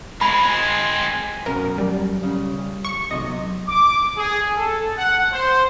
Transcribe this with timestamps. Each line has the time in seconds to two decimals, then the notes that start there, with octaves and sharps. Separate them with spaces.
0.21 G#3 C4 G#5 B5
1.46 F#2 B2 A#4
1.78 G3
2.23 C#3
2.85 C#6
3.11 B1 C3 D#5
3.68 D6
4.17 G#4
4.57 A4
4.98 F#5
5.33 C5